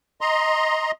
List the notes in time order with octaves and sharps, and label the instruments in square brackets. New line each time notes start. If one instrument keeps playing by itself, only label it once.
[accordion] D#5 A#5 C6